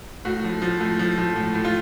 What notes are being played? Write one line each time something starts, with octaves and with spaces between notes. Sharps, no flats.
A2 F#4
F3
F3
A2
F3
F3
A2
A2
F4